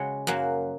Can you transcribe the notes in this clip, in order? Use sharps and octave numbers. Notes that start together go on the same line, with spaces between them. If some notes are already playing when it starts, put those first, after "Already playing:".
Already playing: C#3 G#3 F#4 C#5
F#2 F#3 A#3